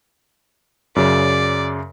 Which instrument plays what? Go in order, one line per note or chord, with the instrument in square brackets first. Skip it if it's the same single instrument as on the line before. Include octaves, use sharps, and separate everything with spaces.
[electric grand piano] F#2 C#3 [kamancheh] D5